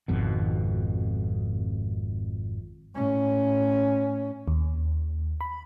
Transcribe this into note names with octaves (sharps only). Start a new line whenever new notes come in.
G#1 F2 B2
A2 C#4
D#2
B5